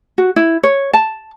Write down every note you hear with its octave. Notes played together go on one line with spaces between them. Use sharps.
F#4
E4
C#5
A5